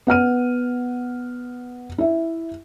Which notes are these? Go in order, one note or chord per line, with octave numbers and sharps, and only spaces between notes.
B3 F#5 F6 D#7
E4 E5